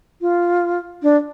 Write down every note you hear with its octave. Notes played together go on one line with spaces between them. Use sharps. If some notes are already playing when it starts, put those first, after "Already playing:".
F4
D4